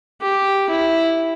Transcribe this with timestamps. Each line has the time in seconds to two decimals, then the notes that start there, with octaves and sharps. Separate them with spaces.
0.21 G4
0.69 E4